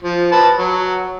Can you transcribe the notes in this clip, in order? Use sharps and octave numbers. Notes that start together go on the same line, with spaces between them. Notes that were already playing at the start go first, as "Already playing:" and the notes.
F3
B4 A5
F#3